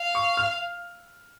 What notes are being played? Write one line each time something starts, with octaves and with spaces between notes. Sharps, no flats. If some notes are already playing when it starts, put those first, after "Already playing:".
Already playing: F5
C#6
F6